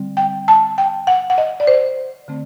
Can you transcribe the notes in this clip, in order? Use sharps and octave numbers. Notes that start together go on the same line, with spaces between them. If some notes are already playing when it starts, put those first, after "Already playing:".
Already playing: D3 G3 C4
G5
A5
G5
F#5
F#5
D#5
D5
C5
D3 A3 C4